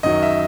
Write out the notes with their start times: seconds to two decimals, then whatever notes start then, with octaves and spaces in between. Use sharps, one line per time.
0.03 F#2 D#3 F#3 D#5
0.22 E5